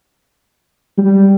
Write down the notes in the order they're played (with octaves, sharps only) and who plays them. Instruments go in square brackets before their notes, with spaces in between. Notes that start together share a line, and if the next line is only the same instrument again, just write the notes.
[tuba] G3